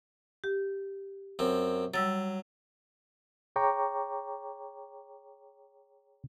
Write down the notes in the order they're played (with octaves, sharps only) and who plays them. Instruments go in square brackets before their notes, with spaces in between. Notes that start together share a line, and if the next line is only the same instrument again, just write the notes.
[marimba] G4
[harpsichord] F#2 C4
[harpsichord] F#3 [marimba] G3 E6 A6
[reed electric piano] G#4 C#5 G5 A#5 C#6 D6